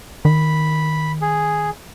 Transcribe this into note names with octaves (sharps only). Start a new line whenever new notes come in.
D#3 B5
G#4